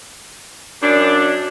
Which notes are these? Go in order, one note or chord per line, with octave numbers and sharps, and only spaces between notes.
F#2 D4